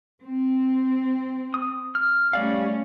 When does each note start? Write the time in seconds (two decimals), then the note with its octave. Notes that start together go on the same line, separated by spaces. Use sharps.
0.23 C4
1.54 D#6
1.95 F6
2.33 G3 A3 C#4 D5 F5